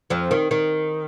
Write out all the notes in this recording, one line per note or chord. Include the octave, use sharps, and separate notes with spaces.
F2 F3
D#3
D#3